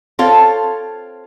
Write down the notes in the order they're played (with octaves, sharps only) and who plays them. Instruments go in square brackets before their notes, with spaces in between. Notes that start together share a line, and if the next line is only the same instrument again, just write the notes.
[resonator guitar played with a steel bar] C4 F4 A4 C#5 F5